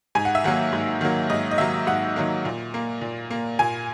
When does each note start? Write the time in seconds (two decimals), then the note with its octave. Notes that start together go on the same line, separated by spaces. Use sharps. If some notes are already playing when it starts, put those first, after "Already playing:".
0.15 G#2 G#5
0.25 F#5
0.35 E5
0.44 D#3 F#3 A#3 F#5
0.73 G#2
1.01 D#3 F#3 A#3
1.30 G#2 D#5
1.51 D#5
1.58 D#3 F#3 A#3 E5
1.87 G#2 F#5
2.16 D#3 F#3 A#3
2.45 A#2
2.74 A#3
3.01 A#2
3.30 A#3
3.59 A#2 G#5